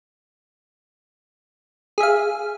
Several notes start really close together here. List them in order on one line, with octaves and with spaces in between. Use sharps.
G#4 E5 F5